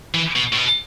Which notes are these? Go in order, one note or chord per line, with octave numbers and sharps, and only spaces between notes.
E3
B2
A2
B2